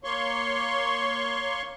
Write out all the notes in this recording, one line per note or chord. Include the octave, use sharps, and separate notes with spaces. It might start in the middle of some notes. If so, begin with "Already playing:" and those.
A#3 C#5 C6 C#6